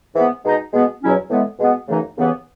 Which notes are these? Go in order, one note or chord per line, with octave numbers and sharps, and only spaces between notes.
G#2 E3 B3
B2 G#3 D#4
B2 G#3 B3
E2 B2 F#3 C#4 E4
A2 E3 G#3 B3
B2 G#3 B3
F#2 C#3 E3 A3 D#4
D#2 C#3 E3 B3